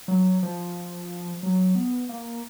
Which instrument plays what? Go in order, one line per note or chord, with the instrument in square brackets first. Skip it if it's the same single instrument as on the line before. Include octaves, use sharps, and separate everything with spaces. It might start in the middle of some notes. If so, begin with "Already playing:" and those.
[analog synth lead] F#3
F3
F#3
B3
A#3